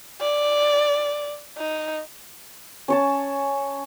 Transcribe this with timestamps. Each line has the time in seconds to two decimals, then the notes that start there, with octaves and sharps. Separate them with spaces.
0.21 D5
1.58 D#4
2.88 C#4 C#5 A5